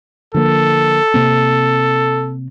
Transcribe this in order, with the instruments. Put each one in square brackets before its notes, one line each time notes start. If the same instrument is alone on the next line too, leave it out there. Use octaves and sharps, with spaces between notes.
[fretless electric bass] D3 F3 A#3 [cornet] A4
[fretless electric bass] C3 A#3 C4